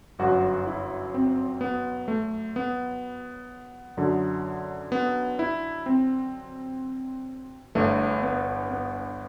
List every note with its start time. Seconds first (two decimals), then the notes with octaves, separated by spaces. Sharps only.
0.19 G1 F#2 F#3 F#4
0.67 E4
1.14 C4
1.61 B3
2.08 A3
2.56 B3
3.97 F#2 D3 F#3
4.92 B3
5.39 E4
5.86 C4
7.75 G1 G2 E3 A3
8.22 B3
8.69 B3